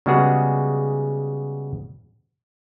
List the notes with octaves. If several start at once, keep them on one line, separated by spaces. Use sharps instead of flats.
C#3 G3 G#3 B3 F#4 G#4